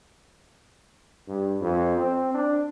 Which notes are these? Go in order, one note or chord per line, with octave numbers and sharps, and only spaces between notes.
G2
F2
C4
D4